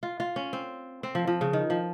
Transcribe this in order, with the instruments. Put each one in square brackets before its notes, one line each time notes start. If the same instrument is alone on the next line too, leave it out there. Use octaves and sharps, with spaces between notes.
[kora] F4
F4
C#4
C4
C4
F3
F3
C#3
D#3
F3